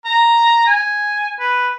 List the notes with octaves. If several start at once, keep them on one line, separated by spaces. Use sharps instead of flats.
A#5
G#5
B4